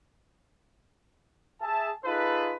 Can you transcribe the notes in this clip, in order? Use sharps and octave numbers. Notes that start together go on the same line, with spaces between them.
G#4 E5 A5
D#4 F4 G#4 A4 B4